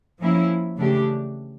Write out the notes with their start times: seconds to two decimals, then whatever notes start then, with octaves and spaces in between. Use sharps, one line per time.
0.20 F3 A#3 C#4 E4
0.77 C#3 E3 A3 D4 G4